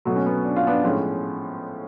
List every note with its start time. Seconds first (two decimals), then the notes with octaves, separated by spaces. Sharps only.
0.05 B2 F#3 A3
0.16 C#4
0.26 B3
0.45 D4
0.56 F4
0.67 B3 D4
0.84 A2 F3 G#3 C#4 F4